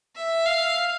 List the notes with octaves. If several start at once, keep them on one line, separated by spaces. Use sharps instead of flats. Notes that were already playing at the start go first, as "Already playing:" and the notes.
E5
F5